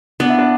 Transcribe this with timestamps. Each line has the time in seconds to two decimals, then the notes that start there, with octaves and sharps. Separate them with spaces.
0.20 B3 D4
0.30 E4
0.39 D4